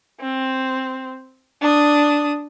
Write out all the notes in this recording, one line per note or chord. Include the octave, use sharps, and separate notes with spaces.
C4
D4 D#6